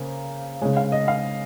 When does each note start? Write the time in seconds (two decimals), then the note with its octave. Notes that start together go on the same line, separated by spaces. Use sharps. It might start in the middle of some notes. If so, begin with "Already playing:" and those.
Already playing: C#3 A#3 C5
0.62 C#3 G#3 C#5
0.77 F5
0.92 D#5
1.08 F5